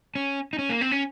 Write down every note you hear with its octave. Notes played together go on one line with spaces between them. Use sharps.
C#4
D#4
C#4
A#3
C4
C#4